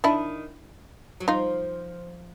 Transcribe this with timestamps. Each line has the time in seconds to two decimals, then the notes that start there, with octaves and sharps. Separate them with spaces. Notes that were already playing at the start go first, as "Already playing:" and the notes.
0.04 D#3 D4 E4
1.20 F#3
1.28 F3 D#4 F4